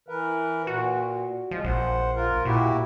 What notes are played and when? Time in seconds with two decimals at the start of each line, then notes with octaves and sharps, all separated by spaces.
0.08 E3 A#4 B4
0.67 A#2 F#4
1.51 F3 G#3
1.65 A#1 C5 F#5
2.16 F4 A#4
2.45 A#2 E4 F#4 G4